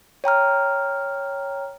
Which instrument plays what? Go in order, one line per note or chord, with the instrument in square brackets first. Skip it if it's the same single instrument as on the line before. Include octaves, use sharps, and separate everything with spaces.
[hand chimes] C#5 G5 A#5 F6